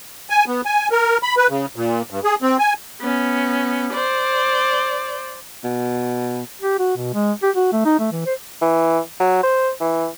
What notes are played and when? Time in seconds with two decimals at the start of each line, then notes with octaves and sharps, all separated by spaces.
0.30 G#5
0.47 B3
0.66 G#5
0.91 A#4
1.23 B5
1.37 B4
1.50 C#3
1.76 A#2
2.11 G2
2.24 G#4
2.42 C4
2.59 G#5
3.01 B3 C#4
3.94 C5 D5
5.64 B2
6.62 G4
6.79 F#4
6.96 B2
7.14 G#3
7.42 G4
7.56 F#4
7.72 A3
7.85 D#4
7.99 A3
8.12 E3
8.26 C5
8.62 E3
9.20 F#3
9.44 C5
9.81 E3